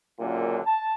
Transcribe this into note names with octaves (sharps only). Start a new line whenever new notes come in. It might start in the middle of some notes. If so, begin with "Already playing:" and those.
C#2 F#2 A#2 D3
A5